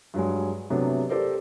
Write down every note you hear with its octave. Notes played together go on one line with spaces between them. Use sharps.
G2 F#3 G#3
C3 F#3 A3 B3 D4
G4 A4 A#4 C5 D5